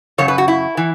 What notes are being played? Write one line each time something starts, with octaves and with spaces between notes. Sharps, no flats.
F#2 C#3 C#5
B4
F#4
E4
E3